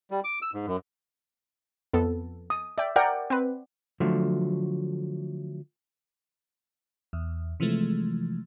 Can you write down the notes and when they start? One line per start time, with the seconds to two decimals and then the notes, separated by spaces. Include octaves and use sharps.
0.11 G3
0.24 D6
0.42 E6
0.54 G#2
0.67 F#2
1.93 F2 B3 A4
2.50 D#6
2.78 D5 E5 G5
2.96 A#4 D5 F#5 G5
3.30 C4 B4
4.00 D3 F3 F#3 A3
7.13 E2
7.60 C3 E3 F3 G#3 A3